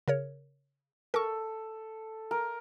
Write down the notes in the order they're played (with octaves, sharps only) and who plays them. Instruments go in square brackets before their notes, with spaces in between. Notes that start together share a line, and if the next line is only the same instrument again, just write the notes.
[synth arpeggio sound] C#3 A#4 C#5
[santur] A4 [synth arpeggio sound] A#4 C#6
[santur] A#4